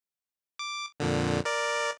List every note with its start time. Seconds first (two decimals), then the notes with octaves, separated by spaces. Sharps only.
0.59 D6
1.00 F2 A#2 D3
1.45 A#4 D5